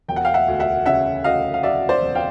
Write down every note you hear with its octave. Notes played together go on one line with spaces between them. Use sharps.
E1 G5
F#5
F5 G5
E5 F#5
D2
E5 F#5
C#3 E5 F#5
D2 D#5 F5
F5
F#3 D5 E5
C5 D5
E1
F5 G5